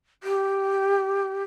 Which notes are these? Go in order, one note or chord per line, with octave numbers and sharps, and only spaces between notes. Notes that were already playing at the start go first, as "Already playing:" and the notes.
G4